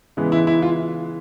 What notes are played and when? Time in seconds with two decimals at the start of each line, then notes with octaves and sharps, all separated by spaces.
0.17 C#3 E3 G#3 B3
0.32 E4
0.47 E4
0.62 F4